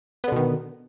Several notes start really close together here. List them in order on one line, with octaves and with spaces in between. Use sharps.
B3 D3 B2 D#3